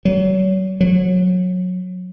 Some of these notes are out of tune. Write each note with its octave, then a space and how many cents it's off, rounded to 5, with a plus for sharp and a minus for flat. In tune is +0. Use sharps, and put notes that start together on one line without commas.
F#3 +35
F#3 -25